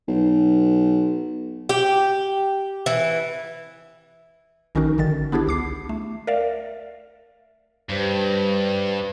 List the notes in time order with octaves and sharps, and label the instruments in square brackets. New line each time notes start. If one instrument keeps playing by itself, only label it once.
[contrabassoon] B1
[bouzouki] G4
E3
[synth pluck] A#1 D#3 C#4 D#4 F#4 A#4
G#1 D3 D#3 A6
B3 D4 E4 G4 G#4
C#2 D6 C7
A3
A#4 D5 E5 F5
[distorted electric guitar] G2 [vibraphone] G4 B4 C5